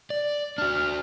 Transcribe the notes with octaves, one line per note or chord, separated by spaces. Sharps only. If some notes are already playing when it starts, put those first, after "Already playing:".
D5
D4 F#4 F6